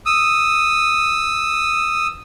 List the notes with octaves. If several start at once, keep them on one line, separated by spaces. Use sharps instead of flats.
D#6 E6